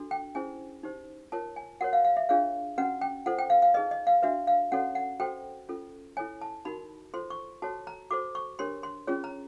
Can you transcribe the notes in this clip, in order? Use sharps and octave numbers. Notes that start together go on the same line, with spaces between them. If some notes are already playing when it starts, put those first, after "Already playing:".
Already playing: D4 F#4 A4
G5
C#4 E4 G#4 C5 G#5
D#4 G4 C5
F4 A#4 C#5 A5
G#5
F#4 A#4 C#5 F#5
F5
F5
E5
D4 F4 G#4 C#5 F5
C#4 F#4 B4 F#5
G5
F4 A4 C5 F#5
G5
F5
F5
D#4 G#4 B4 D#5
D#5
F5
D4 F#4 B4 E5
F5
C#4 F#4 A4 C#5 F#5
F#5
F#4 A4 C5 G5
C#4 F4 A4
E4 A4 C#5 G#5
A5
D#4 F#4 A#4 B5
F4 A4 C5 C6
C#6
F#4 A4 C#5 A5
A#5
F#4 A4 C5 D6
C#6
D4 G4 A#4 C#5 C6
C6
C#4 F4 G#4 C#5
A#5